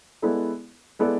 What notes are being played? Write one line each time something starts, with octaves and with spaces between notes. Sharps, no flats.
G#3 B3 E4 A4 D5
G#3 B3 E4 A4 D5